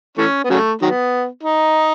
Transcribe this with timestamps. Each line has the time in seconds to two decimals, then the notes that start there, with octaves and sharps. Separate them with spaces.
0.18 E3 A3 C#4
0.44 B3
0.50 C#3 F#3 A3
0.82 D#3 F#3 B3
1.43 D#4